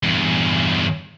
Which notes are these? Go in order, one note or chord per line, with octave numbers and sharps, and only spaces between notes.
E2 G2